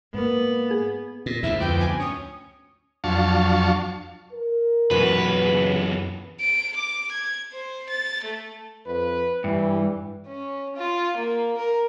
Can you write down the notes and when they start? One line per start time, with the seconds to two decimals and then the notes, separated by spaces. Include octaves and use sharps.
0.14 G#2 A#3 B3
0.71 G#4
1.26 A#2
1.43 D2 G#2 E4 E5
1.60 F2 B3 G5 D6
1.80 G#5
2.00 C#4 D#6
3.04 F2 F#3 D4 F5 A5 C#6
4.33 A#4
4.91 B1 F#2 E3 B4
5.43 C#3
6.41 D7
6.76 D6
7.12 G#6
7.53 C5
7.90 A6
8.24 A3
8.87 F2 B4
9.44 G2 E3 G3
10.27 C#4
10.76 F4
11.16 A#3
11.57 A#4